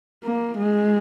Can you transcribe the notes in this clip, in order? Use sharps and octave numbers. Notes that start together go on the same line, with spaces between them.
A#3
G#3